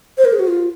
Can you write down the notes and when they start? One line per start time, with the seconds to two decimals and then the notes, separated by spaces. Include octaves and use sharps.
0.18 C5
0.25 A#4
0.33 G#4
0.39 F#4
0.47 F4